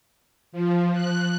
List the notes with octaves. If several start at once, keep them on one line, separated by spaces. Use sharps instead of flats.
F3
F#6